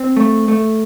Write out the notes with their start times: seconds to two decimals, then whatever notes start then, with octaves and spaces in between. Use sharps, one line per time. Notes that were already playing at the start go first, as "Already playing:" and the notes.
Already playing: C4
0.17 A3
0.48 A3